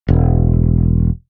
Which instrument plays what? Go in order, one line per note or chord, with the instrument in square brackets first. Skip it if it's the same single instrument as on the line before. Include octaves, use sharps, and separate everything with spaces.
[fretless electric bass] E1